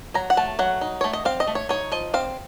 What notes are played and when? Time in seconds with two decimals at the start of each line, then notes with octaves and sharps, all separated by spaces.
0.14 F#3 A#5
0.30 F#5
0.37 A3 A5
0.59 F#3 F#5
0.81 D#4
1.01 A3 C#5
1.13 D#5
1.25 C4 F5
1.40 D#5
1.47 A3
1.55 C#5
1.69 D#4 C#5
1.92 F3 D#5
2.14 C4 F5